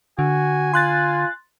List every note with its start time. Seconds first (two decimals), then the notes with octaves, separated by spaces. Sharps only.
0.19 D3 F#4 G#5
0.74 F4 C6 F#6 A6